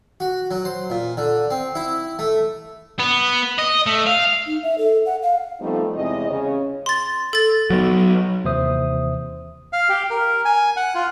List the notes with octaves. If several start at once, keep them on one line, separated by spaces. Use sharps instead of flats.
F#4
F#3
C5
A#2
D3
C4
E4
A3
B3
D#5
A3
F5
D#4
E5
A4
F#5
F5
F3 G3 A3 B3 C4 D#4
E2 C3 G#3 E4 D#5
C#3 C#5
C6 A6
A4 A6
F#3 B3
D#2 C3 E3 C5 E5 D#6
F5
G4
A#4
G#5
F#5
F4